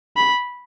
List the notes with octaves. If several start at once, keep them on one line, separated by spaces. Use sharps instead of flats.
B5